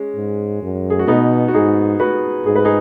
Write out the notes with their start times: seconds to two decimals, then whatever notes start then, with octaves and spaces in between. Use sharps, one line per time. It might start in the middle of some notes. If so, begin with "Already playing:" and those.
Already playing: G#3 C#4
0.16 G#2
0.63 F#2
0.90 G#4
0.99 F#4
1.08 B2 B3 D#4
1.48 F#4
1.54 G#2 D#4 G#4
2.00 F#4 B4
2.46 G#2 G#4
2.56 B4
2.65 D#4 G#4